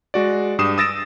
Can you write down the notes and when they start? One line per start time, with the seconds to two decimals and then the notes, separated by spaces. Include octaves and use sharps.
0.14 G#3 F#4 D5
0.59 G2 G4 D#6 C7 E7
0.78 D#6 E6 A6 A#6 D7 E7